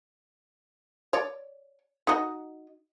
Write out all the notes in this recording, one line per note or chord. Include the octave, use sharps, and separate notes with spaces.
C#5 D5
D#4 F#4 D#5